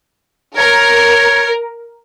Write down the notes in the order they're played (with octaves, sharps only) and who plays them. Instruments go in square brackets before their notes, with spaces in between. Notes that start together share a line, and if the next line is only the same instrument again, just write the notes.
[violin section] A#4 [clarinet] C#5